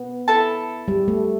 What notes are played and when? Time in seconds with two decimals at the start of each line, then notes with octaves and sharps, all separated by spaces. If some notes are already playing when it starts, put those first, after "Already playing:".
Already playing: B3
0.28 E4 A4 E5 A5
0.88 G3
1.08 A3